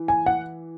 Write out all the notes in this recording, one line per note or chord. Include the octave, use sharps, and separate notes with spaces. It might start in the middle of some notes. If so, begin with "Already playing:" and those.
Already playing: E3
G#5
F#5